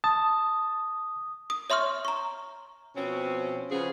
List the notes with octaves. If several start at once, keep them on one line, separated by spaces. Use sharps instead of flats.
A5 D#6
D#6
C#5 E5 C6 C#6 F6
A#5 C#6
B2 F3 C4 C#4
C#3 F3 B3 C#4 G#4